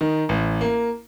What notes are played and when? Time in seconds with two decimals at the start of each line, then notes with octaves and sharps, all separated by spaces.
0.01 D#3
0.29 A1
0.61 A#3